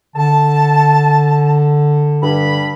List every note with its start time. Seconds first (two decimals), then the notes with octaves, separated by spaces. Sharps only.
0.16 D3 A5
2.23 G2 B5